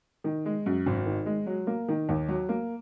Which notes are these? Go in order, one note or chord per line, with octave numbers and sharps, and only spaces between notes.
D#3
G#3
F#2
G#1
D#3
G#3
F#3
A#3
D#3
D#2
F#3
A#3